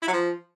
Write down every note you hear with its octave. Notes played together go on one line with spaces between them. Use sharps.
E4
F#3
F3